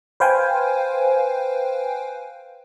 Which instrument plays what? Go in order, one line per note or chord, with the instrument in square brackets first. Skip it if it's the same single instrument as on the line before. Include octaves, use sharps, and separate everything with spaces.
[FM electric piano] B4 C5 F5 G5 G#5